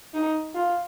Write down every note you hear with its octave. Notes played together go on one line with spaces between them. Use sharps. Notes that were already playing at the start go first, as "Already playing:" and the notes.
D#4
F4